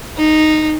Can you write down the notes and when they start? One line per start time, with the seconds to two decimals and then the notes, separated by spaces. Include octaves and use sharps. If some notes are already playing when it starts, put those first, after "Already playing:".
0.18 D#4